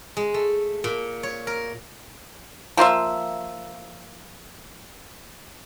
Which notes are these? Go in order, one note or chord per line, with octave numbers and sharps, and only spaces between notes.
G#3
A3
A#2
C#5
A#4
F3 A#3 F4 E5